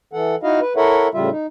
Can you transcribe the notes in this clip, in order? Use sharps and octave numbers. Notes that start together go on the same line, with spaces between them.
E3 A4 F#5
D#4 E4 F#4 D#5 F5
B4
E4 A4 A#4 C#5 E5 F#5
A2 C#3 G3 F4 E5
D#4